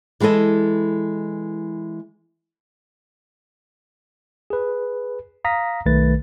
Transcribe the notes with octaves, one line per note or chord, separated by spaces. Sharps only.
E3 G#3 E4 A4 D#5
G#4 B4
F5 A#5 D#6 A#6 B6
B1 D#3 A3 B4 A6